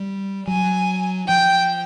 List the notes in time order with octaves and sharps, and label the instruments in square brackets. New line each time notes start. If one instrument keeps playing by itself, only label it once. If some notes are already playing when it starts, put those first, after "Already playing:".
Already playing: [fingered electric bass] G3
[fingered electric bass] F#3 [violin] G#5
[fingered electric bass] F3 [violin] G5